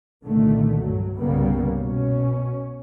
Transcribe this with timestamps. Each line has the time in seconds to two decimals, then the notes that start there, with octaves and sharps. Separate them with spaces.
0.24 C2 A#2 D3 D#3 A3
0.79 G2 F#3
1.19 C2 G2 C#3 G3 A#3 B3
1.77 B2 C#4